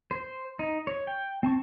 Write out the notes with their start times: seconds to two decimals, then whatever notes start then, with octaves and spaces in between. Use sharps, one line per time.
0.11 C5
0.59 D#4
0.87 C#5
1.07 G5
1.43 C4 A5 C#6